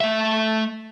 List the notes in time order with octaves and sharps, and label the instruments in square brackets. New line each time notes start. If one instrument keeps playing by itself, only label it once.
[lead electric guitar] A3 E5